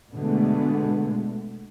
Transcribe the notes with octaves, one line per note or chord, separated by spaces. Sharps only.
B2 D3 G#3 A3 B3